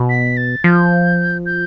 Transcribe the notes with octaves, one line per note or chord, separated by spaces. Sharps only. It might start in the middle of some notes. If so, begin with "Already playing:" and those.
Already playing: B2
B6
A6
F3 G6
G6